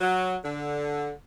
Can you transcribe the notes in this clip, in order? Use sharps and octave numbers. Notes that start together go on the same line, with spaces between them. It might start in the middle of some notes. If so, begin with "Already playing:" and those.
F#3
D3